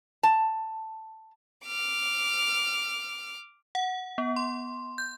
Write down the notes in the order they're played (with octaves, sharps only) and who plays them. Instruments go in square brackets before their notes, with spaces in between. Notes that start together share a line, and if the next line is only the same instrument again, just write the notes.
[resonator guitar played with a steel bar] A5
[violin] D6 F6
[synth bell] F#5
B3
C6
G6